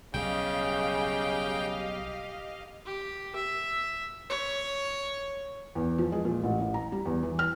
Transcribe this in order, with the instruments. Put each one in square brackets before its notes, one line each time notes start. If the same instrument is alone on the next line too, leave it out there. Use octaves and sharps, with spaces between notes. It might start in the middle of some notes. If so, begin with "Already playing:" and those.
[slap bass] B1 G3 [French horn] C#3 [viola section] G4 D#5 F5 [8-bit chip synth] G5
[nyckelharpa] G4
E5
C#5
[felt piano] E2
F3
G#3
A#2
A1
A1
A#5
G3
E2
E3
F6